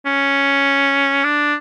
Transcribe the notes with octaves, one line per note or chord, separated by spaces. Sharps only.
C#4
D4